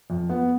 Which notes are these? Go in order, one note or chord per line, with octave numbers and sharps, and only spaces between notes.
F2
B3